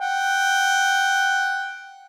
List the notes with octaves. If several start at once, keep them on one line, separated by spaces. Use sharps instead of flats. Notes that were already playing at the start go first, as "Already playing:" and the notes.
F#5 G5